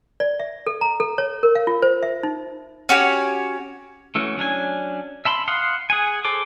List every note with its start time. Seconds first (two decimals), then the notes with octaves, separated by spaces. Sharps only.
0.20 D5
0.40 E5
0.67 A4
0.81 A#5
1.00 A4
1.18 C#5
1.43 A#4
1.55 F5
1.67 F4
1.82 C5
2.03 E5
2.23 D#4
2.89 C#4 F#4 G4 C#5
4.15 E3 A3 C#4 F#4
4.37 F#3 C#4 D4 G#5
5.25 E5 A5 B5 C6
5.48 F5 F#5 C6 D#6
5.90 G#4 F#5 G#5
6.25 G#4 A4 C5 D6